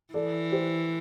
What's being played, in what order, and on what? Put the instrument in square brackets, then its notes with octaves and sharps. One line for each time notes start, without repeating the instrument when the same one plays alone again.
[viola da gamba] E3 [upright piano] A4 D5
[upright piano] G4 C5